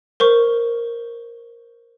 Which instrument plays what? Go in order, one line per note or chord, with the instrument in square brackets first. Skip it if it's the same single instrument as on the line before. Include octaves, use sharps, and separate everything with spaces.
[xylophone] A#4 C5 C#6